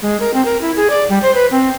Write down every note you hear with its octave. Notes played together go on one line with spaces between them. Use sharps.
G#3
A#4
C4
A#4
E4
G#4
D5
G3
C5
B4
C4